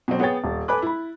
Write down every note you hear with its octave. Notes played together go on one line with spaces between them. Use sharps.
B2 F#3 C4
B3 G#4 C#5 G5 A6
D#1
A4 B4 G#5 B5 D6 F#6
E4 B5